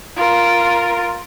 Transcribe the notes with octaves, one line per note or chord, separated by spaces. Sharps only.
F4 A#4